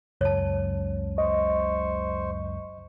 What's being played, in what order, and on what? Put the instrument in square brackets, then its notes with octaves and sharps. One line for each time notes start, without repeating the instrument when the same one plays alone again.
[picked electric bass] F#1 C#2 F#2 [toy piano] C#5 A5
[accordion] C5 C#6 [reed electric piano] D#5